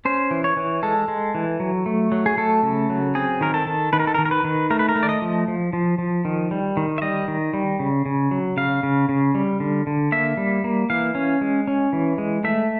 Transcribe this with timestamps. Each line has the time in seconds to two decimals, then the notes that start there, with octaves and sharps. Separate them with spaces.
0.05 C#4 C5
0.31 E3
0.44 C#5
0.57 E3
0.83 G#3 A4
1.08 G#3
1.35 E3
1.60 F#3
1.86 A3
2.12 F#3
2.26 G#4
2.37 A3 A4
2.63 C#3
2.90 F#3
3.15 C4 G#4
3.41 D#3 A#4
3.54 A4
3.67 D#3
3.93 D#3 B4
4.00 A#4
4.07 A4
4.14 A#4
4.19 D#3
4.25 A#4
4.31 B4
4.44 D#3
4.70 A3 A#4
4.79 B4
4.89 A#4
4.96 A3
5.03 D5
5.09 D#5
5.22 F3
5.48 F3
5.73 F3
5.98 F3
6.25 D#3
6.51 G3
6.77 D#3
6.98 E5
7.02 G3 D#5
7.28 D#3
7.54 G3
7.79 C#3
8.06 C#3
8.31 F#3
8.57 C#3 F5
8.83 C#3
9.09 C#3
9.35 G3
9.60 D3
9.87 D3
10.12 A#3 E5
10.37 G3
10.64 A#3
10.90 E3 F5
11.15 C#4
11.41 G#3
11.68 C#4
11.93 E3
12.18 G#3
12.44 A3 E5